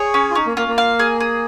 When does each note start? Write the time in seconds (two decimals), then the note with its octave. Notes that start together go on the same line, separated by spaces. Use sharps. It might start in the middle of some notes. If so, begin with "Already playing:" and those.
Already playing: G#4 C#5
0.14 C#4
0.31 F4
0.35 C#4 D#4
0.46 A#3
0.57 A#3 F4
0.68 A#3
0.78 F5
0.99 G#4
1.20 G#4